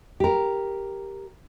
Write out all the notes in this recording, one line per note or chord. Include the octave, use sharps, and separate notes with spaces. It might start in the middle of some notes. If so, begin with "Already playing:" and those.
G4 A#4